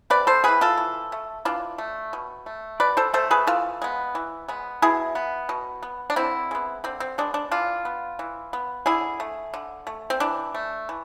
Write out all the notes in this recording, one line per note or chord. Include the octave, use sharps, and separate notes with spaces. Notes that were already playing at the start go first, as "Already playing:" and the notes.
C3 B4 D5
A4 C5
E3 B3 G#4 B4
F4 A4
E3
A3
E3 D4 F4
A3
B2
A3
B2 B4 D5
A4 C5
A3 A4 C5
G#4 B4
E3 F4 A4
G#3 B3
E3
G#3 B3
B2 E4 G#4
B3
B2
B3
D4
D3 C4 E4
G#3 B3
D3 C4
C4
G#3 B3 D4
D4
E3 D4 F4
B3
E3
B3
D3 E4 G#4
A3
D3
A3
C4
E3 D4
A3
E3